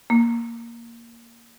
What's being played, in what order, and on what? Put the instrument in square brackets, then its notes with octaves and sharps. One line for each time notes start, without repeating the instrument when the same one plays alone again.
[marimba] A#3